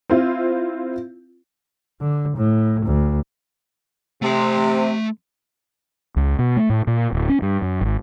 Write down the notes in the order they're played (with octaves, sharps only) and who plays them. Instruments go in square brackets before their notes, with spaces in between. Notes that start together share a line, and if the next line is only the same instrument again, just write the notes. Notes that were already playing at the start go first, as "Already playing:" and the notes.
[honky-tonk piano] C4 E4 F4
[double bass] D3
A2
D2
[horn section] C3 [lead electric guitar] A3 C6
[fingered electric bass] C#2
B2
A3
A2
A#2
D1
C#4
G2
F#2
G#1